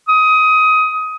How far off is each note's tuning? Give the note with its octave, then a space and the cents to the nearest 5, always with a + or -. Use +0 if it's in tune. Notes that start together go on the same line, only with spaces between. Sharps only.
D#6 +20